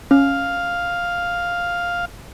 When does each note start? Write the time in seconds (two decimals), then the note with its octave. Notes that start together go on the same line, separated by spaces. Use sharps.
0.11 C#4 F5